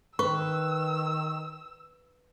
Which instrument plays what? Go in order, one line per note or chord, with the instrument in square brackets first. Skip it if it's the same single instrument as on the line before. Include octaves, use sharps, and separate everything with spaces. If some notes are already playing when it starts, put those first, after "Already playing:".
[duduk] D#3 [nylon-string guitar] B4 [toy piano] C#6 [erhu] E6